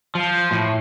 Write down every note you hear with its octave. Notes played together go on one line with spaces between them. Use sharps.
F3
A2